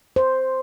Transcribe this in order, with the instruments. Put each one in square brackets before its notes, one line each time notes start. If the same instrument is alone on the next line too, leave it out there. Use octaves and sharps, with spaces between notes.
[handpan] C5